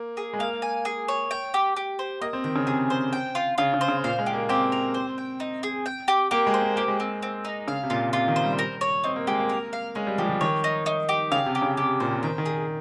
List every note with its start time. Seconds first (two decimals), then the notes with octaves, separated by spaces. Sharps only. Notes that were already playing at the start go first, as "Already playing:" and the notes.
Already playing: A#3
0.17 G#4
0.33 G#3
0.39 A#3 F5
0.62 G#5
0.85 G#4
1.08 C#5
1.31 G5
1.54 G4
1.76 G4
1.99 C5
2.21 A#3 D#5
2.33 C4
2.44 D#3 G5
2.56 C#3
2.67 C3 G#4
2.90 C5
3.13 G5
3.35 F4
3.58 C#3 F4
3.74 C#3
3.81 C5
3.88 C#3
4.04 A#2 F5
4.19 G#3
4.26 G4
4.34 A#3
4.49 C4 G4
4.72 A#4
4.94 C5
5.18 G5
5.40 D#4
5.63 G#4
5.86 G5
6.08 G4
6.31 A#3 G4
6.47 G#3
6.54 C5
6.62 A#3
6.76 A#3 G4
6.88 G#3
7.00 C4
7.22 C4
7.45 D#4
7.68 C#3 F5
7.83 C3
7.90 A#2 F4
8.13 C3 F4
8.28 D#3
8.36 C5
8.44 G3
8.59 A#4
8.81 C#5
9.04 C4 D#4
9.16 A#3
9.27 G#3 G4
9.40 A#3
9.49 A#4
9.73 F5
9.95 G#3 C#4
10.07 G3
10.18 F3 G4
10.25 G3
10.29 F3
10.41 D#3 C#5
10.64 D#4
10.86 D#4
11.09 G4
11.32 C#3 F5
11.46 C3
11.55 G4
11.62 C#3
11.77 C3 G4
12.00 A#2 C5
12.11 C3
12.23 D#3 G5
12.38 D#3
12.46 G#4